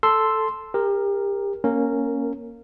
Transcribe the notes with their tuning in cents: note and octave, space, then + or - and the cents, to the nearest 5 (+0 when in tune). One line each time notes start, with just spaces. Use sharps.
A4 +0 C6 +0 E6 +0
G4 +35 A#4 +0
A#3 +10 C#4 +0 A#4 -15